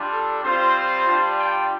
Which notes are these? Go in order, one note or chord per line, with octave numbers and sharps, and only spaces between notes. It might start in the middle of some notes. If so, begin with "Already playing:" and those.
Already playing: G3 D4 F4
A4
G3 C4 F4 C5
G3 D4 F4
G5